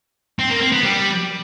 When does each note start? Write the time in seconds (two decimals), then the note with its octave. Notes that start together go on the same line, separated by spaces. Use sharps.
0.39 C4
0.50 A#3
0.61 C4
0.72 B3
0.83 G3